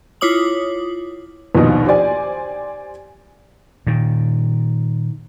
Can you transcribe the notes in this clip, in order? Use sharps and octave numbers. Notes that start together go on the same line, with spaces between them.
E4 F4 C#5 D6 D#6 F#7
A#1 D#2 B2 D#4
G4 C5 D5 G#5
A#2 D#3